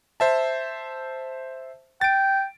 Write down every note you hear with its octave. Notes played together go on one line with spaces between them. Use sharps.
C5 E5 A5
G5 A6 D7